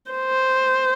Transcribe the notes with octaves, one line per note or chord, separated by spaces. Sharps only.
C5